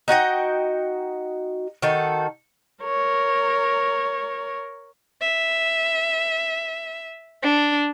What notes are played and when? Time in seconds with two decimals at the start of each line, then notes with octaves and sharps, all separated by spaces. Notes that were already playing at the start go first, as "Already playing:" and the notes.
0.08 D#4 F#4 D#5 G5
1.82 D#3 D#4 F#4 A4
2.84 A#4 C#5
5.21 E5
7.43 D4